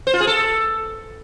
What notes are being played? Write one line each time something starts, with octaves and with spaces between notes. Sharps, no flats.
C5
F4
G#4
A4